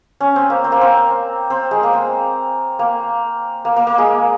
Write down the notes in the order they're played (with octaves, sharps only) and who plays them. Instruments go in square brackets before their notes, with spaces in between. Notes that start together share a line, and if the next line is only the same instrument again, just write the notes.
[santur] C#4
C4
A#3
C4
A#3
C4
C4
G#3
A#3
C4
A#3
A#3
A#3
A#3
G#3